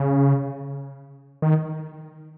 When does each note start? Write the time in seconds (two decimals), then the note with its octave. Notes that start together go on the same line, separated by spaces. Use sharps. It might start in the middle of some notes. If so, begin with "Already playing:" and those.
Already playing: C#3
1.42 D#3